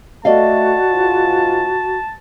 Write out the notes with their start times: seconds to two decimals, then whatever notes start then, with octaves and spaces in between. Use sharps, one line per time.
0.25 A3 F#4 D5 D#5 F5 A5
0.90 G#2 F4